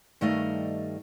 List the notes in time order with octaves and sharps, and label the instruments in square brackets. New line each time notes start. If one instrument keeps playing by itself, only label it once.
[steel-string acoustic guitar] G2 D#3 G3 A3 D#5 F5